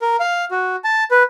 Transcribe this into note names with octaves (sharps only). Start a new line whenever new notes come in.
A#4
F5
F#4
A5
B4